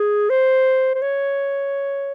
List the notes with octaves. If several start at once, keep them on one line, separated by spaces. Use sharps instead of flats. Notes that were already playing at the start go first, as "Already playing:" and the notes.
Already playing: G#4
C5
C5
C#5